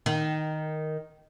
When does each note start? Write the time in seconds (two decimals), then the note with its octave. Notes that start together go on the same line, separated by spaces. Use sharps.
0.06 D#3